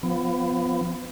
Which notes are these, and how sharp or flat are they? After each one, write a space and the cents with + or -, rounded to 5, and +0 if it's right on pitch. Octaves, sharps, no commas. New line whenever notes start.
F3 +0 B3 +25